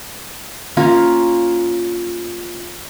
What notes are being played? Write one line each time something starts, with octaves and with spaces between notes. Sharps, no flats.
A#3 C#4 F4